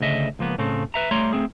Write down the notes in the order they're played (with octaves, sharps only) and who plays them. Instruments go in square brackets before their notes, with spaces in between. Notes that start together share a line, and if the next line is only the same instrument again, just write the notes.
[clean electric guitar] D2 C#3 D#5 E5
C#2 F3 A#3 B3
A2 C#3 A3 C4
B4 E5 A#5
G3 A3 C#5 A#5 C6
A3 C4 G#4